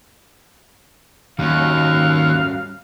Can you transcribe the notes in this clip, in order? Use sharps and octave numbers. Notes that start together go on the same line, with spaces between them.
D#2 G3 C#4 F#4 F5 F#6